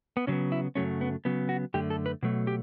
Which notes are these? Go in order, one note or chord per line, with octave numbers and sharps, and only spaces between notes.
B3
C#3 F#3 B3 C#4
E4
F#2 C#3 F#3 A3 C#4
B3
C#3 F#3 B3
F#4
F#2 D3 A3 G4
A4
B4
B2 F#3 A3
G4